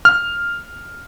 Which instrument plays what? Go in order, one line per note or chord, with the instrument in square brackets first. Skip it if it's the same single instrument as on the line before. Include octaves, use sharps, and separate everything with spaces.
[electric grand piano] F6